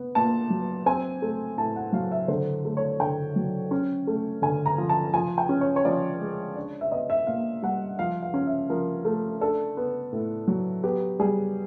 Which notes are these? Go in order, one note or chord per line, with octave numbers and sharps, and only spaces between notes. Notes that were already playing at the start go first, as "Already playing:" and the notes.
Already playing: B3
A#2 A5
F#3
C4 G#5
A3
A2 A5
F#5
F#3 F5
E5
D3 C5
A3
C#5
D3 G5
F#3
C#4
A3
D3 G#5
A#5
F3
A5
F3 G#5
G5
C#4
C#5
C#5
F3 D5
G#3
D4
E5
B3 D#5
E5
A#2 F5
G3 F#5
F3 F5
F5
C#4
E5
F3 A#4
A3
D4 A4
B3
A2
F#3
B3 G4
G3 G#4